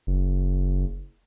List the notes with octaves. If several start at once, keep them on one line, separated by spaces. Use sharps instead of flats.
F#1